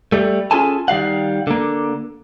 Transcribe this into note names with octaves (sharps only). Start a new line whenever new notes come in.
G3 A3
C#4 F4 G#4 A4 G#5 A5
D#3 G3 F5 F#5
D3 A#3